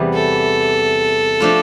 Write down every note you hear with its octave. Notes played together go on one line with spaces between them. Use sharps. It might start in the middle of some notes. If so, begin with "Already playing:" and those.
Already playing: E2 C3 E3 G3 B3
A4
F3 A3 D4 F4